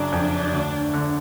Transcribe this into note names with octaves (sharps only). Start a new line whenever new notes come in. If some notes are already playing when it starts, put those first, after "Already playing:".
Already playing: F#1 F#2 D4
F2
D2
D3